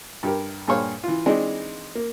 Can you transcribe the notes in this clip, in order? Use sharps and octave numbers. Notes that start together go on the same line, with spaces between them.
G2 G4 A#4
G2 A#2 G#4 C5 C#5 F5
E3 F4
E3 G#3 C4 D4 D#4
A#3